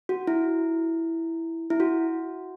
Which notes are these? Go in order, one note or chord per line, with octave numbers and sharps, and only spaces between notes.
F#4
E4
E4
F#4